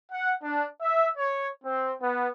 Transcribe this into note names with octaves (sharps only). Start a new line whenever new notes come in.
F#5
D4
E5
C#5
C4
B3